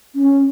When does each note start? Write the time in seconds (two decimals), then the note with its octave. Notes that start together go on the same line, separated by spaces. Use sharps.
0.16 C#4